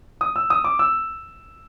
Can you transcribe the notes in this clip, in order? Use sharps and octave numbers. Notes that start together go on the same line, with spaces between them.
D#6
E6
D#6
D6
E6